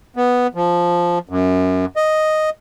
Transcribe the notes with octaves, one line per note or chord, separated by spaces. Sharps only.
B3
F3
F#2
D#5